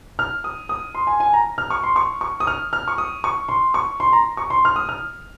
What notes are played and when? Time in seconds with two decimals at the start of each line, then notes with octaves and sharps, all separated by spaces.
0.19 F6
0.44 D#6
0.69 D#6
0.95 C6
1.07 G#5
1.20 G#5
1.33 A#5
1.58 F6
1.70 C#6
1.83 C6
1.96 C#6
2.21 C#6
2.40 D#6
2.47 F6
2.73 F6
2.88 C#6
2.98 D#6
3.24 C#6
3.49 C6
3.74 C#6
4.00 C6
4.13 A#5
4.37 C#6
4.50 C6
4.65 F6
4.76 D#6
4.89 F6